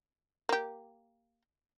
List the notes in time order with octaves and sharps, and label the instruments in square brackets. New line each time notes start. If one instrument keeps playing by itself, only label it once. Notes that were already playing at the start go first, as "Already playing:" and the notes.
[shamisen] A#3 G4